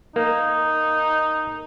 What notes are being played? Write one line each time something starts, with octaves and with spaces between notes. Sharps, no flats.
A#3 D#4